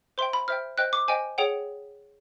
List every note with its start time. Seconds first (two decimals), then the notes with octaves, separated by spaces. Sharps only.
0.18 C5 E5 G5 C6
0.33 B5
0.48 C5 E5 G5 F6
0.78 C5 D#5 G5 F#6
0.93 D6
1.08 C5 D#5 G5 G#5
1.38 G#4 C#5 F#5 G5